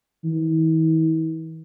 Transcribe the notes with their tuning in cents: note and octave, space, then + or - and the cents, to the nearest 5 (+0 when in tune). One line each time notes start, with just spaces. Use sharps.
E3 -45